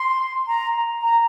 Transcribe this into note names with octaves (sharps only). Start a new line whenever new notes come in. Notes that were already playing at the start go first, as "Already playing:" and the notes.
Already playing: C6
A#5
A#5